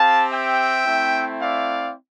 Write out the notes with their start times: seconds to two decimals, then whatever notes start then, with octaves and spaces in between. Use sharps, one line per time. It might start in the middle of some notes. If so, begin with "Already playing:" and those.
Already playing: C4 G4 F5 A5
0.31 E5 G5
0.86 A3 C4 E4
1.40 D5 F5